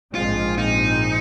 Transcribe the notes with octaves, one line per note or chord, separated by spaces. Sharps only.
A#1 G#2 F3 G#3 C4 F4
D#4